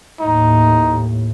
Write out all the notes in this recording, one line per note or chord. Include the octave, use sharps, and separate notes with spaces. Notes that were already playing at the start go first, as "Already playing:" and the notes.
D#2 A2 D#4